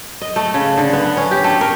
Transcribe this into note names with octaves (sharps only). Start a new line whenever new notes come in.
D#5
A3
C#3
D3
B3
C#4
G4
A3
A#4